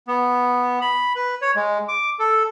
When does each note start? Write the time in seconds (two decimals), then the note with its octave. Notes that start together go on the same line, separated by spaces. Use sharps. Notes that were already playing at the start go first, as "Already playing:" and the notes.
0.08 B3
0.81 B5
1.16 B4
1.42 C#5
1.56 G#3
1.88 D6
2.19 A4